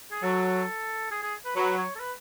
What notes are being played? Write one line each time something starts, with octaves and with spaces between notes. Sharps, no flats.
G#4
F#3 A4
G#4
G#4
B4
F#3 B4
C#5
A4
B4